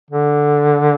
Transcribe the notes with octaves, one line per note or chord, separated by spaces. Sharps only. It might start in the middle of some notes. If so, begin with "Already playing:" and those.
D3